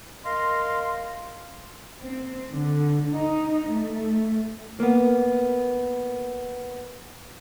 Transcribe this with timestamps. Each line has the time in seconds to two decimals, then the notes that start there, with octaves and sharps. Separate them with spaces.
0.24 A#4 D#5 F5 C6
2.04 C4
2.52 D3
3.16 D#4
3.72 A3
4.80 A#3 B3